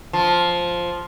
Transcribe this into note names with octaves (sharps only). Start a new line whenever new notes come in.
F3